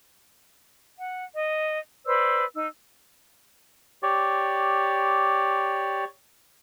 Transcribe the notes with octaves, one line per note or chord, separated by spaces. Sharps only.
F#5
D#5
B4 C5 D5 E6
D#4 E6
G4 C#5 D5